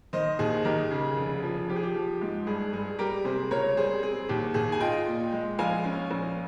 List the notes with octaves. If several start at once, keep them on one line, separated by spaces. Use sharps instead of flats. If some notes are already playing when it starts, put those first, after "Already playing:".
D#3 C5 D#5
D#2 G#4
D#3 G4 A#4
C#3 G#4
F1
F3
F3 G4
G#4
G4
F3
G#2
G2 G#4
G2 G#4
G3 G4 A#4
C3 G#4 C5
C#2 A#4 C#5
G3 G#4 C5
C4 G#4
D#2 G4
D#2 G#4
G#5
F4 D#5 G5
A#2
G#3
A#1 F5 G#5
C#4
A#1